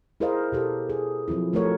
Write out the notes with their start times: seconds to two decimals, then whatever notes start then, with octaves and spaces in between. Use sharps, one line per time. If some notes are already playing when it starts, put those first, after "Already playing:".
0.20 E4 G#4 A#4 C5 D#5 F5
0.52 B2 G4 A4
0.89 G#4
1.28 F3 F#3 C4 E4
1.53 F3 A3 F#4 A4 A#4 C#5